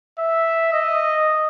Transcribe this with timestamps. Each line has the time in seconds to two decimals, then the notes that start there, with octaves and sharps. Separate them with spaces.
0.19 E5
0.72 D#5